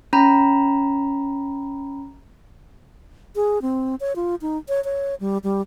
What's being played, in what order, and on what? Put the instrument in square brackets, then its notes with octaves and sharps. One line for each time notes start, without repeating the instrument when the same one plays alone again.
[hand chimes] C#4 A#5 B5
[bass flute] G#4
C4
C#5
F4
D#4
C#5
C#5
G3
G3